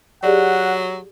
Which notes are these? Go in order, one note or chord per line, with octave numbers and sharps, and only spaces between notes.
F#3 G4 G#4 D5 F#5